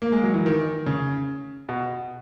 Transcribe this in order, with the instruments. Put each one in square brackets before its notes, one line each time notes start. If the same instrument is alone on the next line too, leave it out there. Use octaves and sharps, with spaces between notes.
[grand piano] A#3
G#3
F#3
E3
D#3
C#3
B2